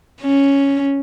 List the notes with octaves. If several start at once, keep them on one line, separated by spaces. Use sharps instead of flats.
C#4